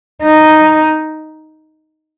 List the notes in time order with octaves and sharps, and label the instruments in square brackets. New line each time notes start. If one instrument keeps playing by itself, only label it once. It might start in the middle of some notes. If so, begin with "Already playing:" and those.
[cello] D#4